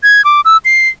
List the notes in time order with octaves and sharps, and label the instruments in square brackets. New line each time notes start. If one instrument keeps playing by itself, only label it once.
[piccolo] G#6
D6
E6
C7